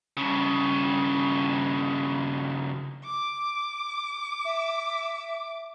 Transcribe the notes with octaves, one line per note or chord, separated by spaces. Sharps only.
G2 C#3
D6
E5